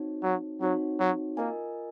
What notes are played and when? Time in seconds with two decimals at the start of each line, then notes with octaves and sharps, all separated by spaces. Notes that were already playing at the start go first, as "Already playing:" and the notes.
Already playing: C4 D#4 F#4 C#5
0.23 F#3
0.61 F#3 C4 D#4 F#4 C#5
0.99 F#3
1.37 A#3 F4 A#4 D#5 G#5